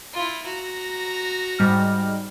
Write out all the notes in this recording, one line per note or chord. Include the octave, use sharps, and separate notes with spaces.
E4 F4
F#4 A#5
G#2 G3 F6